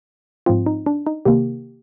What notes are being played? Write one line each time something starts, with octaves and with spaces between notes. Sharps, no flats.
G#2 F3 C4 F4
D#4
D4
D#4
C3 D#3 A#3 G4